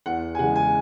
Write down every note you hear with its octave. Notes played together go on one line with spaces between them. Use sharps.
E2 F#5
G#5
C#3 E3 G#3 F#5
G#5